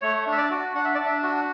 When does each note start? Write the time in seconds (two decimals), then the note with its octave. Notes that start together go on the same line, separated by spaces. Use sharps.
0.02 A3 C#5
0.27 D4
0.32 E5
0.38 D5
0.51 F#4
0.75 D4 F#5
0.85 E5
0.95 D4 D5
1.05 E5
1.23 F#4